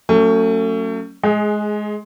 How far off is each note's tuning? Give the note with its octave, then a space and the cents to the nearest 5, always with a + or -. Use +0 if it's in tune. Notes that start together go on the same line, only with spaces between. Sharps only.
F#3 +0 A3 +35 C#4 +0
G#3 +20 G#4 +0